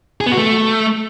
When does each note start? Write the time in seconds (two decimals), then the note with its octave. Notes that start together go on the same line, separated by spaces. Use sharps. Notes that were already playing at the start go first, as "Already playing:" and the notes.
0.21 G#4
0.26 B3
0.32 F#4
0.37 A3